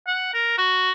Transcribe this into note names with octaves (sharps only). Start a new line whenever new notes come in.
F#5
A#4
F#4